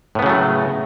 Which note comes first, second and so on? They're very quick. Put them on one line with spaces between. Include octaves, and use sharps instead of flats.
A2 B3 C#3 F#3 A3